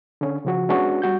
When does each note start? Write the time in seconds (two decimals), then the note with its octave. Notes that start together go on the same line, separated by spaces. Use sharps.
0.21 D3 C#4
0.45 C#3 F3 F#4
0.69 G#3 B3 C#4 D4 F#4
1.02 G3 F#4 G6